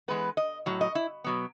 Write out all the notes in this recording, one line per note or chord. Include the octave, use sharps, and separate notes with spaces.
E3 G#3 B3 B4
D#5
A2 F#3
D#5
E4
B2 F#3 B3